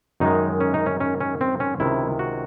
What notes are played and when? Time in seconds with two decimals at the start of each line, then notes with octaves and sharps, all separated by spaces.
0.20 F#2 D#3 G#3 D#4
0.61 C#4
0.74 D#4
0.86 C#4
1.00 C#4
1.21 C#4
1.41 C4
1.60 C#4
1.80 C#2 C3 D#3 E4
2.19 F#4